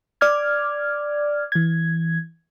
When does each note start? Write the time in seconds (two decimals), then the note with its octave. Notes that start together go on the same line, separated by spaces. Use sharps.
0.21 D5 D6 F6 G#6
1.52 E3 G#6